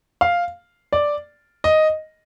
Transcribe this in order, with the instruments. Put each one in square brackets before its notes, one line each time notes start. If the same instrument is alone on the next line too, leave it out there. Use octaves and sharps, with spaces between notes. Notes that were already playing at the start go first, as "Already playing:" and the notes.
[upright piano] F5
D5
D#5